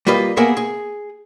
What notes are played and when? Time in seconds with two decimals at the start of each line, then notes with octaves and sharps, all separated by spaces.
0.07 G3 A#3 F4 B4 D#5
0.37 A#3 B3 G#4 A#4 E5
0.57 G#4